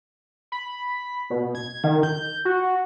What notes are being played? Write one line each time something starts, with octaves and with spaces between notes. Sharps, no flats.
B5
B2
G#6
D#3
G6
F#4